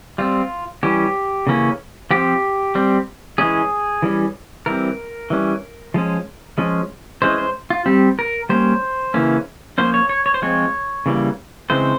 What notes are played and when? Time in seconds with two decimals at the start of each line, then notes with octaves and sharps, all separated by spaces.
0.18 G3 C4 F4
0.83 E3 G3 C#4 G4
1.47 C#3 E3 A#3 C#4
2.11 F3 C4 G4
2.75 G3 C4
3.38 E3 G#3 C#4 G#4
4.02 E3 G3 C#4
4.66 E3 G3 C4 A#4
5.30 E3 G3 C#4
5.94 F3 G#3 C#4
6.58 F3 G#3 C#4
7.22 E3 G#3 C#4 C5
7.38 C5
7.70 F4
7.86 G3 C4 G4
8.19 A#4
8.49 G3 A#3 C#4 C5
9.14 C#3 E3 A#3 C#4
9.78 F3 A#3 C#4 C5
9.94 C#5
10.09 C#5
10.26 C#5
10.34 C5
10.42 F3 G#3 C4 C#5
11.06 C#3 E3 G3 A#3
11.70 C#3 E3 G#3 C4 C5